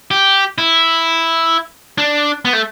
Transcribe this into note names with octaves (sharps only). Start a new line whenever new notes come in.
G4
E4
D4
B3
A3